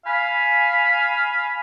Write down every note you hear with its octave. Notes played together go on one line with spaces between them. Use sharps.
F5 G#5 B5